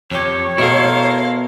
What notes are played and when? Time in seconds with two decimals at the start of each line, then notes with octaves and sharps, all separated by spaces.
0.11 F2 G4 C#5
0.58 B2 E4 A4 A#4 F5 C6